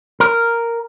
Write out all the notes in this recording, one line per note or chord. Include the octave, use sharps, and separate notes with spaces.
A#4